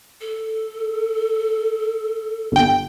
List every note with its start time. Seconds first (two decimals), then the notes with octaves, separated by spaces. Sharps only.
0.21 A4
2.52 G1 G5